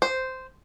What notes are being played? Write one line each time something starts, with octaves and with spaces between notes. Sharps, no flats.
C5